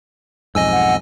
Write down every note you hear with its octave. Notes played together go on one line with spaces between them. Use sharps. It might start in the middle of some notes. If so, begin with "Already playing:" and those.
B1 F2 G#2 D#5 G#5 E6
F#5